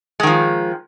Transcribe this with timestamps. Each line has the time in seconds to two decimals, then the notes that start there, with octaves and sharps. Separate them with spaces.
0.20 G#3
0.23 D#3
0.27 F3